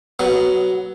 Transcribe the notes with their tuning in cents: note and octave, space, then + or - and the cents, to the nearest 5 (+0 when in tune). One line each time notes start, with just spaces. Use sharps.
F#3 +15 B3 +0